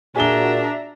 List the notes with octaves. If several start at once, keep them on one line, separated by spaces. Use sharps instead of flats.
A#2 D4 F#4 G#4 E5 A#5 G7